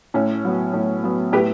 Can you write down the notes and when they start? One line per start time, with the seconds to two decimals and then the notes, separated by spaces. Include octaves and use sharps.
0.14 A2 C#4
0.45 F#3 B3
0.73 A2
1.04 F#3 B3
1.32 A2 G4 B4